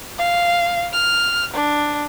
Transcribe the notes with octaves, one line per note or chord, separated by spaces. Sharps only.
F5
F6
D4